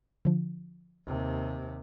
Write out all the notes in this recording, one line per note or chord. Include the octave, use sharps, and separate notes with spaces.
D3 F3
D#2 C3